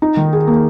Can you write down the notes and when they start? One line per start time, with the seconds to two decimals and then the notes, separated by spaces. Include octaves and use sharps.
0.02 D#4
0.17 D#3
0.33 G#4
0.47 A#3